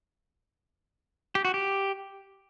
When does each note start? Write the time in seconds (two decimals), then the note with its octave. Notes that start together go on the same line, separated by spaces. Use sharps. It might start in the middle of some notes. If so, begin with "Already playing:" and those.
1.35 G4
1.45 F#4
1.54 G4